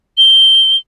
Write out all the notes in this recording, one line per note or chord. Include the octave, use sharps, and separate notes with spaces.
G7